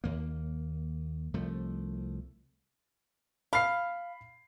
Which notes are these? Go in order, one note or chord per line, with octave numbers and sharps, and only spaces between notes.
D#2 A#3
C2 F3 A3
F5 B5 C7